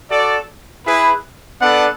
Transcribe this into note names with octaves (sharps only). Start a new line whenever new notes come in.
F#4 A4 D5
E4 G#4 B4
B3 D4 A4 D5 F#5